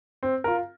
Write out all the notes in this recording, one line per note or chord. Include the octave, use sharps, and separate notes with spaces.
C4
F4 A#4